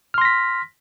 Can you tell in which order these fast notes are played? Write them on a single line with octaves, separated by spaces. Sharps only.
F6 C6 A#6 B6